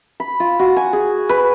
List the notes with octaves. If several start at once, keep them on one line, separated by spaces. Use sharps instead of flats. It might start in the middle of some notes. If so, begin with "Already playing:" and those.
B5
F4
F#4
G#5
G#4
B4